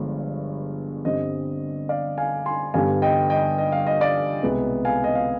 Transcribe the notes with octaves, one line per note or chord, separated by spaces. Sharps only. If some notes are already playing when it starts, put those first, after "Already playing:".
Already playing: G1 G2 D3 F3 G#3
G2 D3 G3 C4 D#5
D5 F5
F5 G#5
G#5 C6
G2 D3 G3 B3 F5 G#5
D#5 G5
D#5 G5
D#5
F5
D#5
D5 F5
C2 B2 G#3 B3
F5 G#5
D#5
F5